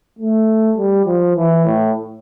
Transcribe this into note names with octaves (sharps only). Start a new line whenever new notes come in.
A3
G3
F3
E3
A2